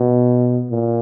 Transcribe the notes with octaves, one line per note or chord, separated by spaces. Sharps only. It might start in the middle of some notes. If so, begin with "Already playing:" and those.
Already playing: B2
A#2